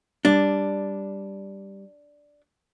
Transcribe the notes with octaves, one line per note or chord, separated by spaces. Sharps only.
G3 D4